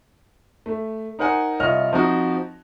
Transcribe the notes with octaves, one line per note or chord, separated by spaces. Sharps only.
A3
D#4 A#4 C5 F#5 G#5
C2 F4 C#5 D#5 F6
F3 C4 D#4 F#4